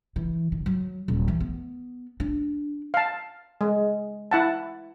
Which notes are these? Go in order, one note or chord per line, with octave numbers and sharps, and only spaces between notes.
E3
D#3
F#3
D#1
E3
B3
D4
F5 A5
G#3
E4 F#5 A5